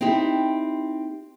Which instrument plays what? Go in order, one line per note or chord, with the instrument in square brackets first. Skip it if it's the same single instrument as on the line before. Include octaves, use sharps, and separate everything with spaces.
[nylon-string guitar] C4 D#4 E4 G4